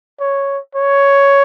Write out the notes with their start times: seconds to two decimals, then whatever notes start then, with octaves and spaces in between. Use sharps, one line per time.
0.20 C#5
0.75 C#5